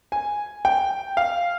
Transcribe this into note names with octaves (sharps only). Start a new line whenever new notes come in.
G#5
G5
F5